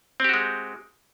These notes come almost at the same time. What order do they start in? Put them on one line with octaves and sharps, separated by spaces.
C4 G4 F#4 G#3